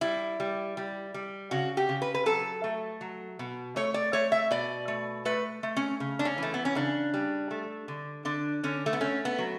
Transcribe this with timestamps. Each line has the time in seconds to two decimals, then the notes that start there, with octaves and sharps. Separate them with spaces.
0.01 G3 E4
0.40 G3
0.77 G3
1.14 G3
1.51 C#3 F#4
1.77 G4
1.89 C#3
2.02 B4
2.14 B4
2.26 F#3 A4
2.64 A3
3.01 F#3
3.39 B2
3.76 A3 C#5
3.94 D5
4.13 A3 C#5
4.32 E5
4.51 B2 D5
4.88 A3
5.25 A3 B4
5.63 A3
5.77 C#4
6.00 C#3
6.19 D4
6.25 C#4
6.38 E3 A3
6.54 B3
6.65 C#4
6.75 C#3 D4
7.14 G3
7.51 A3
7.88 D3
8.25 D3 D4
8.63 D3 C#4
8.86 A3
8.93 B3
9.01 A3 C#4
9.25 B3
9.38 F#3